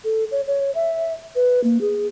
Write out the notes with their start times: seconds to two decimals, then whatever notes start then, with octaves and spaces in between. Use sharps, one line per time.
0.04 A4
0.32 C#5
0.47 C#5
0.75 E5
1.35 B4
1.64 A#3
1.81 G#4